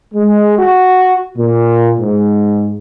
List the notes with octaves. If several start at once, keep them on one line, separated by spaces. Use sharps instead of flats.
G#3
F#4
A#2
G#2